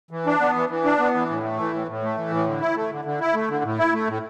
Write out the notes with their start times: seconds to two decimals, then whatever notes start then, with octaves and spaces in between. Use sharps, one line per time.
0.11 E3
0.26 D4
0.40 B3
0.56 E3
0.70 E3
0.85 D4
0.99 B3
1.14 E3
1.29 A2
1.43 A3
1.58 E3
1.73 A2
1.87 A2
2.03 A3
2.17 E3
2.31 A2
2.46 D3
2.60 E4
2.76 A3
2.91 D3
3.05 D3
3.20 E4
3.34 A3
3.49 D3
3.64 A2
3.78 E4
3.93 A3
4.08 A2